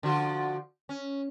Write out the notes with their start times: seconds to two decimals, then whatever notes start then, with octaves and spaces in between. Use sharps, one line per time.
0.03 D3 F3 F#4
0.89 C#4